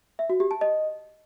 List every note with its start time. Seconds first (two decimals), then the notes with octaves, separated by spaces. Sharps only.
0.19 E5
0.30 F#4
0.40 G4
0.51 A5
0.61 D#5